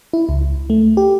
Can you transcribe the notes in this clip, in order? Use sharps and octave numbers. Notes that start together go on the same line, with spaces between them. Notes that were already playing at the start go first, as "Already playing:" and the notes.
E4
C#2
A3
G4